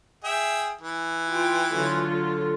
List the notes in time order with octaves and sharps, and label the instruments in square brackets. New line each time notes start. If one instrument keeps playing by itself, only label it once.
[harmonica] G#4 E5 G5
E3
[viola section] F4 G5
D3 F#3 F4